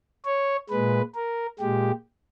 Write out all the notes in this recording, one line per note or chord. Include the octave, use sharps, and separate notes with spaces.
C#5
A#2 G#3 B4
A#4
A#2 G#3 G4